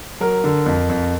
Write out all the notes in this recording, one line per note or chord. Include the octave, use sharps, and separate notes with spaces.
F#3 A#4
D3
F2
F2